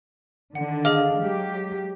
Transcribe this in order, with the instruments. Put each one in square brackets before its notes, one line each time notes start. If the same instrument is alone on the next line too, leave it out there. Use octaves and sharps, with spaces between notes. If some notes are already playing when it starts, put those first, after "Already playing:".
[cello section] D3 D#3 D4 [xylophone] F#5
[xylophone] G#4 D#5 D6 [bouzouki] F5
[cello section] F#3 G#3 G4